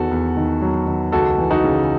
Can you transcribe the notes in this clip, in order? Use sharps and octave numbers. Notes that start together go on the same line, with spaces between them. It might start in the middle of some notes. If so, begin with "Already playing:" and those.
Already playing: E2 D#3 F#4 A4
E2
D#3
F#3
D#3
C#2 F#4 A4
E3
D#4 F#4
C#3